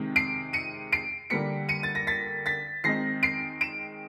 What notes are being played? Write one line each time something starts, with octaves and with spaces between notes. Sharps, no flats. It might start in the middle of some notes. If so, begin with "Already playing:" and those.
Already playing: C3 D#3 G#3
C7 D7
C#7 D#7
C7 D7
D3 G3 A#3 B6 C#7
C#7 D#7
A6
A#6
A6 B6
A6 B6
D#3 G#3 C4 D#4 A#6 C7
C7 D7
D7 E7